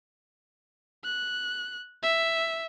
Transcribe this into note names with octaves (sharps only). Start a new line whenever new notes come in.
F#6
E5